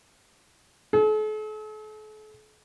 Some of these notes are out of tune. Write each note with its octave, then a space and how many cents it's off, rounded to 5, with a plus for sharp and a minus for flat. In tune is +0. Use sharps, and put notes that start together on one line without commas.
A4 -45